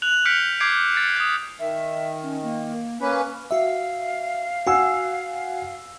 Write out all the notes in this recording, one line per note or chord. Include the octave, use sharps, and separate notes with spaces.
F#6 F7 F#7
F6 G6 B6 C#7 D7 F7
D6 G6 G#6 C7 D7
A6 C#7
D#6 G6
D#3 E5
C#4
A#3
A#3 C#4 B4
F#4 E5 F5
F#4 F#5 G#5 E6